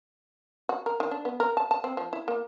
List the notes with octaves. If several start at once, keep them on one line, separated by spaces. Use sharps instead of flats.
F#4
A#4
D#3
D4
B3
A#4
A5
A5
C4
F3
E4
A#3